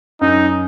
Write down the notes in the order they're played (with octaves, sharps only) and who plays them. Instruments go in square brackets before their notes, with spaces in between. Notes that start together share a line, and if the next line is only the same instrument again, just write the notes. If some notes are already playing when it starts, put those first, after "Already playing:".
[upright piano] F#2 [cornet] D#4